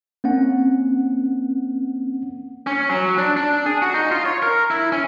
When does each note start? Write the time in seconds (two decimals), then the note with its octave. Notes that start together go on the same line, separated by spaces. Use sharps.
0.24 A#3 C4 C#4 F#5
2.67 C#4
2.89 F#3
3.18 D4
3.37 D4
3.66 G#4
3.82 F#4
3.94 D#4
4.11 F4
4.25 C#5
4.43 A#4
4.71 E4
4.92 C#4